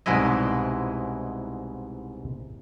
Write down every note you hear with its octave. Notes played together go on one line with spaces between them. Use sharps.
C2 G#2 B2 G#3 E4 D#5